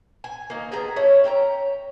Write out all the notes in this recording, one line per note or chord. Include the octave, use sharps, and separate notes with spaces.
G#5
D#3 A#3
B3 G#4 G5 A#5
A3 C#4 E4
C#4 G5 A5 A#5